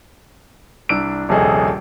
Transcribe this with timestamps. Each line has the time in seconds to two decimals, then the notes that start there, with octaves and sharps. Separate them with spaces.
0.89 C2 D4 E6 D7
1.29 D#1 A#1 C3 G#4 A4 D#5